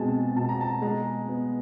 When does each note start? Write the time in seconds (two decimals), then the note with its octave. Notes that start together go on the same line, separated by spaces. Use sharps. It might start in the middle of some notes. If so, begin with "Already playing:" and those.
Already playing: B2 G#3 C4 G#5 A5
0.36 B2 A5
0.49 A#5
0.61 A5
0.82 G#3 A#5
1.28 B3